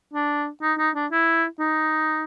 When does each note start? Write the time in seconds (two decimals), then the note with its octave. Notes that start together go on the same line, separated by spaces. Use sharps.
0.14 D4
0.62 D#4
0.79 D#4
0.95 D4
1.12 E4
1.60 D#4